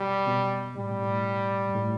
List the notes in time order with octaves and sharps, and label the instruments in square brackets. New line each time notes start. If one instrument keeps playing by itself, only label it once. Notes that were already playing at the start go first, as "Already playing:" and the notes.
Already playing: [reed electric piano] B2 [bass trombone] G3
[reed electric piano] B2
[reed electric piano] A2 [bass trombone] G3
[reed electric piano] B2
A2
G2
A2